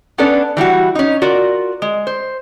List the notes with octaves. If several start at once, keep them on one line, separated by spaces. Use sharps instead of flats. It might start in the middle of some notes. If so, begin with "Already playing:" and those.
B3 C#4 D4 A4 B4 D5
E3 G3 E4 F#4
C#4 D#4
F4 F#4 A#4 D5
G#3
C5